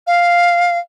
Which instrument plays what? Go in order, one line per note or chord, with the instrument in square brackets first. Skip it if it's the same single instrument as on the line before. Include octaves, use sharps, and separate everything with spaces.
[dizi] F5